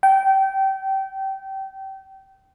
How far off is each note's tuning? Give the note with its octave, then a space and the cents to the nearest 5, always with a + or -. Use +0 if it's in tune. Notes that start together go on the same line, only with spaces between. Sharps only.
G5 -25